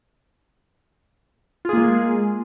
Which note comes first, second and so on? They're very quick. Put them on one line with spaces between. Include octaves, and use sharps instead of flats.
F4 G#4 A#3 G#3